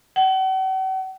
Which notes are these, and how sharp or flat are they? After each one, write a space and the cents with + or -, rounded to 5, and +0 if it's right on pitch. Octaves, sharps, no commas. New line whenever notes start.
F#5 +45